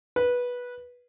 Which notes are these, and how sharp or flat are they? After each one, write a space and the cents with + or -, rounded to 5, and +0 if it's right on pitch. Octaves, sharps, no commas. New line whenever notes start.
B4 -15